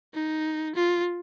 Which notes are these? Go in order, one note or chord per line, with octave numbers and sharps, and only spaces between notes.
D#4
F4